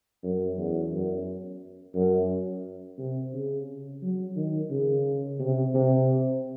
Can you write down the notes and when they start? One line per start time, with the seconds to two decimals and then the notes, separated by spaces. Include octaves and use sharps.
0.23 F#2
0.57 E2
0.93 F#2
1.95 F#2
2.98 C3
3.33 C#3
4.02 F#3
4.36 D#3
4.70 C#3
5.39 C3
5.74 C3